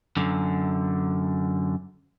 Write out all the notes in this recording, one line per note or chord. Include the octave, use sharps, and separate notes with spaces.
F#2 D3